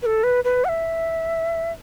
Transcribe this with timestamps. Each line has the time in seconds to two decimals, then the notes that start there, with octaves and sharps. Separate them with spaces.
0.02 B4
0.06 A4
0.24 B4
0.44 B4
0.65 F#5
0.69 E5